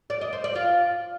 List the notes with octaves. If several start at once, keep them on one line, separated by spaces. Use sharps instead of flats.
D5
D#5
C5
D5
F4